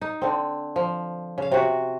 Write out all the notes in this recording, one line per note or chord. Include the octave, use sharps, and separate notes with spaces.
D#4
D3 C4
F3
C#3 F5
C3 F#4